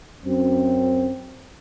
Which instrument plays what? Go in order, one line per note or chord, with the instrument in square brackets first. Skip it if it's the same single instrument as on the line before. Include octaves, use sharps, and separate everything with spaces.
[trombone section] F#2 C4